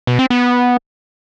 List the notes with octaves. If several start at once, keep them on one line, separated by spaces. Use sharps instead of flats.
B2
C4
B3